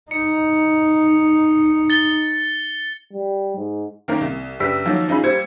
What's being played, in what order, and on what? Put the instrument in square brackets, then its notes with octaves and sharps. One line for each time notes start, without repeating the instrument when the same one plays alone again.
[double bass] D#4 [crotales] C#7
[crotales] A6 G7
[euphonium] G3
G#2
[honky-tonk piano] D#3 A#3 C#4 A#4
C2
F#1 D4 G4 B4 E6 B6
D#3 F3 F#3 A#3 D#4
C#4 D#4 F4 G#4 B5
G3 A#3 C5 G#6 C#7